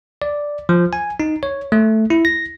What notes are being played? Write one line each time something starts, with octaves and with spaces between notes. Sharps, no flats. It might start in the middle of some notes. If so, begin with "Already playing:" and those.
D5
F3
G#5
D#4
C#5
A3
E4
A#6